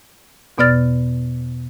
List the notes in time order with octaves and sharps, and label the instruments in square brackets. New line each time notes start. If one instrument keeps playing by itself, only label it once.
[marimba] E2 B2 B3 D5 F6 A6